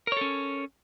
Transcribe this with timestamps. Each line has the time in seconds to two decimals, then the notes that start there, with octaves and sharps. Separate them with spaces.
0.07 A#4
0.12 C#5
0.17 A4
0.21 C#4